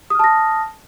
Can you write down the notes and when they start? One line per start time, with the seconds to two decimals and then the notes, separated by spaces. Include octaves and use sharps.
0.10 D#6
0.15 F6
0.19 A5
0.24 A#6